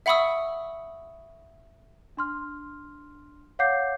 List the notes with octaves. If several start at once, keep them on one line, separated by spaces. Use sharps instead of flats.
E5 F#5 B5 C#6 D#6 E6
D4 C6 F6
C#5 F5 F#5 D6 G6 C7